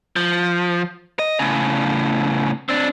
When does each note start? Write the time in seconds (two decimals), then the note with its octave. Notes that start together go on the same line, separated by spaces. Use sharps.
0.16 F3
1.19 D#5
1.39 A2 C#3
2.69 C4 D4